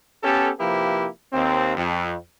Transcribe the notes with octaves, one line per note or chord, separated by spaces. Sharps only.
B3 C#4 G4 A4
C3 F3 A#3 E4 G4 B4
D#2 C4
F2